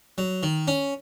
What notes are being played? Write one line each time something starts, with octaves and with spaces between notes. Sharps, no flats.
F#3
D#3
C#4